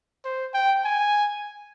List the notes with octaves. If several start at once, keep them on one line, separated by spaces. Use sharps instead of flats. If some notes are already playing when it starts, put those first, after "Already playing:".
C5
G5
G#5